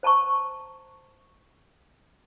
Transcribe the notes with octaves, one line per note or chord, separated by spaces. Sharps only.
C5 A5 A#5 C#6